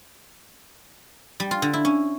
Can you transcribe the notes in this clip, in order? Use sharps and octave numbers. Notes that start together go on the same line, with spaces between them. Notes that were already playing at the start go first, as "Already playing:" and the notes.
G3
F4
D3
E4
C#4